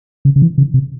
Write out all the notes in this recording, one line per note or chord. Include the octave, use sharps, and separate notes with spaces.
C#3
C#3
E3
C#3
C3